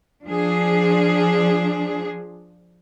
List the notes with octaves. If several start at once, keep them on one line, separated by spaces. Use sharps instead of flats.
F3 D4 G#4